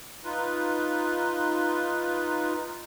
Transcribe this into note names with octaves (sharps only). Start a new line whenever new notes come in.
D#4 F4 B4